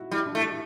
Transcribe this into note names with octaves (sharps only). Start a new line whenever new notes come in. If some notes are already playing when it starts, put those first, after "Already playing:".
Already playing: E4 F#4
G3 E4
D4
A3 E4